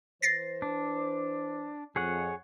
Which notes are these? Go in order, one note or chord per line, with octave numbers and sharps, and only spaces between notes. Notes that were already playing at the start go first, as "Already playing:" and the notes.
E3 B4 C5 A6 A#6 C7
D4
F2 G#4 C#5 F#5